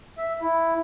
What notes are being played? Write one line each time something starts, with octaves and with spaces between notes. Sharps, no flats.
E5
E4